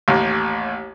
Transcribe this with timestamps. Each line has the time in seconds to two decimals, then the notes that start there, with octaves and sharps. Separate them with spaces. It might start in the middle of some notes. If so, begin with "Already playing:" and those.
0.08 A1 D#2